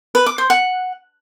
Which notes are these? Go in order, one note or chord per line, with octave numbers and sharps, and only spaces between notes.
B4
D6
C5
F#5